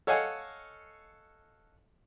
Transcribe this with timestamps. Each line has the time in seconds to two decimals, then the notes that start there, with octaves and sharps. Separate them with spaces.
0.07 A4 C#5 D#5 F5 F#5 G#5